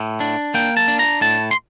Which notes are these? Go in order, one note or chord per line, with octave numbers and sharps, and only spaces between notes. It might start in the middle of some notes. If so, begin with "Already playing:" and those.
Already playing: A2
D4
A#3 G5
A5
D4
A#5
A2 A5
C6